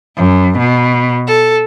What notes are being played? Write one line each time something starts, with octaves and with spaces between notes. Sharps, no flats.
F#2
B2
A4